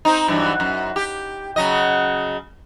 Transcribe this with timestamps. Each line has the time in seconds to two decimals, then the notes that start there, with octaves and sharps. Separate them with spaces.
0.05 C4 D#4
0.28 G2 E3 F#3
0.60 F#2
0.96 G4
1.56 C#3 F#3 D#5